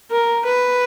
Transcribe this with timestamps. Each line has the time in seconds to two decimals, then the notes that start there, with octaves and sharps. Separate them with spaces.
0.11 A#4
0.45 B4